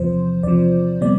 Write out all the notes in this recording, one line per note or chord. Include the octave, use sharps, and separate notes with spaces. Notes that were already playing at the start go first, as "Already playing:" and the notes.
Already playing: E2 C3 F3 C5
E2 C3 F3 D5
C3 G3 B3 D5